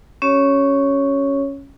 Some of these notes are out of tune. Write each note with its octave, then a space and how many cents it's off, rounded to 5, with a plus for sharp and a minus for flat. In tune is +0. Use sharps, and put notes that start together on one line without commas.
C#4 +0 G4 -30 C#5 +0